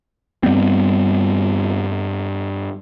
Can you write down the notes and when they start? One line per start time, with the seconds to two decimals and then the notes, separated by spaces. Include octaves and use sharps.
0.43 G2 G3 B3 C4